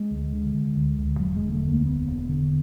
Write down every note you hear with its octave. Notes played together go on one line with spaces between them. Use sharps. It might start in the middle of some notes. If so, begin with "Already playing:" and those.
Already playing: G#3
D2
D3
D3
D2
D2
E1 F#3
G#3
D3
A3
D2
A#3
E1 B3
E1
D3